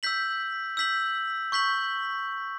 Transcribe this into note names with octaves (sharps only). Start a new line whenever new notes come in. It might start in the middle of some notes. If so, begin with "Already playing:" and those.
E6 G6 B6 F#7
E6 G6 B6 F#7
C#6 G6 B6 F#7